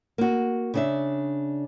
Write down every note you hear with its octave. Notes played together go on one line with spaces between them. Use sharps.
A#3 F#4
C#3 D4 E5